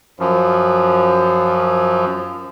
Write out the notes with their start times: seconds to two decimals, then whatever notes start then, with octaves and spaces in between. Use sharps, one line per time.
0.20 F#2 F3